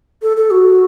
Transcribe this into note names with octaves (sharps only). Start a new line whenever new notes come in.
A4
A4
F#4